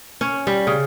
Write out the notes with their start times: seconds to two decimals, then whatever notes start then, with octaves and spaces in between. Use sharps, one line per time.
0.21 C#4
0.47 G3
0.67 C#3